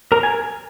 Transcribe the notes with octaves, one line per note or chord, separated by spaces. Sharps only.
A#4 A#5
G#5